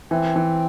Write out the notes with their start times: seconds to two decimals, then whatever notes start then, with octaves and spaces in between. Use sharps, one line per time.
0.10 E3 C4
0.36 E3